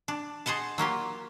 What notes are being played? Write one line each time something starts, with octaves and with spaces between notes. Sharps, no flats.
D4
G#4 C5 D#5 F#5 A5
F#3 A#3 F4 G4